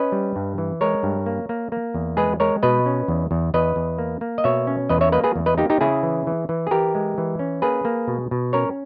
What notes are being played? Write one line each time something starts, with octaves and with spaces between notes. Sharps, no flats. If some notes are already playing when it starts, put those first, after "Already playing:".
Already playing: C#4 B4 D#5
G3
G2
E3
G#3 A#4 C#5
G2
A#3
A#3
A#3
E2
G#3 G#4 B4
G#3 A#4 C#5
B2 B4 D#5
C#4
E2
E2
E2 B4 D#5
E2
A#3
A#3
D#5
B2 C#5 E5
C#4
E2 B4 D#5
C#5 E5
A#3 B4 D#5
G#4 B4
E2
B4 D#5
A#3 D#4 G4
D#4 G4
C#3 E4 G#4
E3
E3
E3
G#4
E3 G4 A#4
G#3
E3
C#4
A#3 G#4 B4
A#3
B2
B2
C#4 A#4 C#5